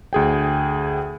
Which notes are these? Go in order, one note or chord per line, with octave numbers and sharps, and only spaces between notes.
D2 G#4 G5